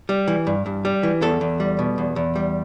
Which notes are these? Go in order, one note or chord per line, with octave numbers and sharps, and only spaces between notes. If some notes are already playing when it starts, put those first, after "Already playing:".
G3
E3
G2
G2
G3
E3
E2 A4
E2
G3
B2
E2
E2
G3